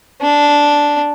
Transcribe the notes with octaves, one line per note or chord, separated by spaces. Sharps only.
D4